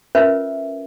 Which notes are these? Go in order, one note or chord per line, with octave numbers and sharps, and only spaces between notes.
C#4 F4 A#4 B4 E5